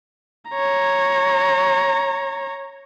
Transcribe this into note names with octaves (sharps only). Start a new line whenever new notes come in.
C#5 A#5